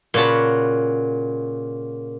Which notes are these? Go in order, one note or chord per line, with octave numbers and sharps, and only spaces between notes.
A#2 C#3 F#4 A5 B5